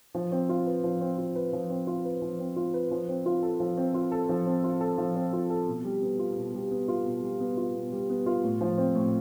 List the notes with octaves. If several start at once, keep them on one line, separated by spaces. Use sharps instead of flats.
F3
C4
F4
B4
F3
C4
F4
B4
F3
C4
F4
B4
F3
C4
F4
B4
F3
C4
F4
A4
F3
C4
F4
A4
F3
C4
F4
A4
F3
C4
F4
A4
B2
G3
B3
F4
B2
G3
B3
F4
B2
G3
B3
F4
B2
G3
B3
F4
A2
F3
C4
A2